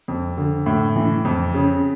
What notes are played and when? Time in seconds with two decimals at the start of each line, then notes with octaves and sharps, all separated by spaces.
0.08 F2
0.37 D3
0.66 A2
0.96 E3
1.25 F2
1.54 C#3